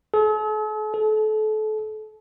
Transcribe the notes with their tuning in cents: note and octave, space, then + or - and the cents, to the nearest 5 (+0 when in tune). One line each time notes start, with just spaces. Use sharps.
A4 -45
A4 -30